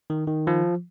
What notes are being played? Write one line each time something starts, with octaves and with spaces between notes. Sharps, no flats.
D#3
D#3
F3